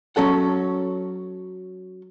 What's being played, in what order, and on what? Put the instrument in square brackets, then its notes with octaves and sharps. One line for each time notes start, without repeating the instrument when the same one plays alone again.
[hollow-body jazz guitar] F#3 C#4 A4 F#5